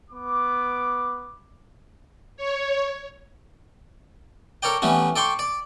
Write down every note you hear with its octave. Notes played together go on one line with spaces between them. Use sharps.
B3 D6
C#5
A4 A#4 C#5 D5 G5
E3 G3 A3 B3 C#4
A4 D5 G5 C6 C#6
D5